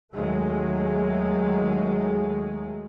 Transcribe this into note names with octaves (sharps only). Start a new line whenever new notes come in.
D#2 D#3 F#3 G#3 A3